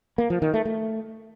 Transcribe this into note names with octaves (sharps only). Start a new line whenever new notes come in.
A#3
F3
D#3
A3
A3